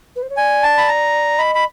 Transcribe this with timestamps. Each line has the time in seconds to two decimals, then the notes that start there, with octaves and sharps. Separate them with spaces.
0.16 B4
0.22 C5
0.30 C#5
0.37 D5 G#5
0.63 A5
0.78 B5
0.88 A#5
1.38 D#5 B5
1.55 B5